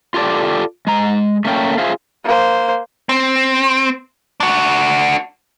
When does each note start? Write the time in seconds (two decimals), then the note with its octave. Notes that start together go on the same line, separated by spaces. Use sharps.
0.14 F4 G4 A4 D5
0.87 G#3 A#5
1.45 A3 A#3 C#4 D4 G5
1.78 F4 G#4 C5 E5 F5
2.24 A#3 C5
3.09 C4
4.40 D4 F#4